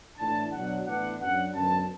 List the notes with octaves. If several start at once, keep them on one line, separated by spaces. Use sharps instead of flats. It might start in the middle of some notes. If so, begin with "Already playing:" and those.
A2 E3 D4 A5
B2 F#3 D4 F#5
A2 E3 B3 D4 F#5
F#2 F#3 D4 F#5
F#2 D3 B3 A5